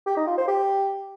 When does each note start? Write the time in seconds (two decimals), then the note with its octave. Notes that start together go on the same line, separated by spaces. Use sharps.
0.06 G4
0.16 D#4
0.27 F4
0.37 C5
0.48 G4